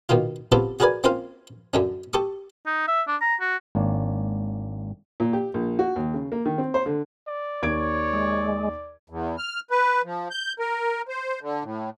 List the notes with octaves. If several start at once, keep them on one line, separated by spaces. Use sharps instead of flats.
B2 D#3 A#3 F4
C#3 B3 C4 F4 G4 A4
F#4 G#4 A#4 B4 D5 G#5
A#3 C4 C#4 F4 C5 F5
F#2 D3 C#4
G4 A4 C#6 D#6
D#4
E5
D4
A#5
F#4
G#1 A#3 D4 C#5
A#2
G4
A#1
F#4
D#2
C#3
A#3
D#3
C4
C5
D3
D5
D#2 C#5 G#6 D7
G#3
E2
F6
B4
F3
G6
A#4
C5
D3
A2